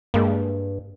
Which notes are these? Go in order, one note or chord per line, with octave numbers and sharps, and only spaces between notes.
G2 G#3 A#3